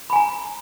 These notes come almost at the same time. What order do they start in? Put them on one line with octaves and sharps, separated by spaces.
B5 G#5 A#5